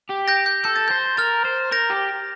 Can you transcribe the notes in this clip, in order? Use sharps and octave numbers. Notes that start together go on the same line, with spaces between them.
G4
G6 A#6
G6
A4 G6
A6
C5 G6
A#4 F6 A6
C5
A#4 G6 A#6
G4